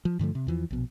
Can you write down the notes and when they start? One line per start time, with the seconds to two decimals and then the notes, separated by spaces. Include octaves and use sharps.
0.05 F3
0.19 G2 D3 F3 A3
0.35 C3
0.47 E2 E3 F3
0.71 A#1 B2